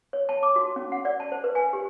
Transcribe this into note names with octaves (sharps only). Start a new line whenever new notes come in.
C#5
A5
D6
F#4
C#4
F#5
D5
A5
C5
B4
G#5
G4